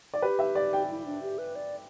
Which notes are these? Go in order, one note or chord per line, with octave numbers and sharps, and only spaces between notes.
D5
G4 B4
E5
D5
G5
E4
D4
G4
B4
D5